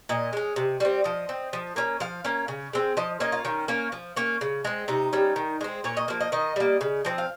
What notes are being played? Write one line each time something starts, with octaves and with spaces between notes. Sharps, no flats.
A#2 D#5
G#3 C#4
C3
G3 C4
F3 D#5
C4
F3
A#3 C#4
F3 F5
A#3 C#4
C#3
G#3 C4
F3 D#5
A#3 C#4 D#5
F4
D#3 C#4
A#3 C#4
F3
A#3 C#4
C#3
G#3 C4
C3 D#4
G3 C#4
D#3
G#3 C4
A#2 C#5
D#5
F3 A#3 F5
D#5
D#3 D#5
G3 A#3
C#3
F3 C4
F5